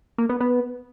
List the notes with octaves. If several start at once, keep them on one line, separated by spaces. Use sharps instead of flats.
A#3
B3
B3